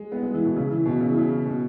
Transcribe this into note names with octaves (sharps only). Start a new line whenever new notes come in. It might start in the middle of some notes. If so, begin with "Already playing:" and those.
Already playing: G#3
B3
G#3
E3
B2
C#3
E3
B2
C#3
E3
C#3
B2